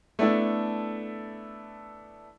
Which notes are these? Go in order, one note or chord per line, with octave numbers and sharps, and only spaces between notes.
A3 B3 D4 E4 A4